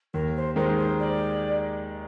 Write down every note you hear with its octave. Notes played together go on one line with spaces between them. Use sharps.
D#2 A#4
C5
D#3 G#3 D#4 A#4 C5
C5
D5